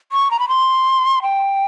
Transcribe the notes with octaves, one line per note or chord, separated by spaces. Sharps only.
C#6
A#5
B5
C6
G5